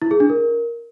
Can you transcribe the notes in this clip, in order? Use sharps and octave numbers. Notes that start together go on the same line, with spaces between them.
E4
G#4
D4
A#4